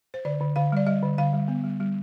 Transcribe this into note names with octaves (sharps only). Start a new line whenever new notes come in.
C5
D3 D5
D3
D3 F5
G3 D5
G3 D#5
D3
D3 F5
G3
B3
G3
G3